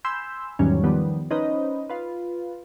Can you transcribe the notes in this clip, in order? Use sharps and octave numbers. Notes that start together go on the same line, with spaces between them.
G#5 B5 C6 E6 G6
E2 G#2 D#3 F#3 G3 C#4
D#3 F3 G3 B3
C#4 D#4 B4 C5 D#5
F4 B4